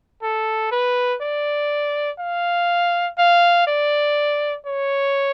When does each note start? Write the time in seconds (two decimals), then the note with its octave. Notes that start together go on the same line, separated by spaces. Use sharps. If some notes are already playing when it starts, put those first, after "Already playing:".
0.23 A4
0.72 B4
1.22 D5
2.19 F5
3.19 F5
3.67 D5
4.66 C#5